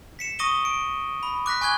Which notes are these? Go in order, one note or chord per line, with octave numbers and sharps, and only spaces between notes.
B6 C#7 E7
C#6 D#6 A#6 D#7 G7
D7
B5
D6 F#6 A#6 B6
G#5 C#6 F#6 G#6 G7